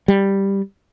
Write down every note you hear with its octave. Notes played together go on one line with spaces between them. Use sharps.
G3